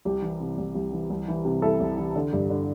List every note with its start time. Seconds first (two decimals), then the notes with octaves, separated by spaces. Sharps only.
0.05 C2 G4
0.22 E3
0.40 C3
0.58 C2
0.75 C2
0.92 E3
1.10 C2
1.28 E3
1.45 C3
1.62 C2 E4 A4
1.80 C2
1.98 E3
2.16 D3
2.33 G2
2.50 D3